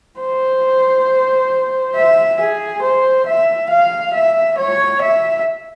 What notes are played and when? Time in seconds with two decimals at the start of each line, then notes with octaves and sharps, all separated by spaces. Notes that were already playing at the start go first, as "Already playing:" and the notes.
0.20 C5
1.95 E5
2.39 G#4
2.82 C5
3.26 E5
3.70 F5
4.14 E5
4.58 C#5
5.02 E5